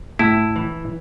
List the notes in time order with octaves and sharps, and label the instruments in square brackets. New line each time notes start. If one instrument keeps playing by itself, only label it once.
[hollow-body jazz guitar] A2 [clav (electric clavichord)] E4
[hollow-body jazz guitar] E3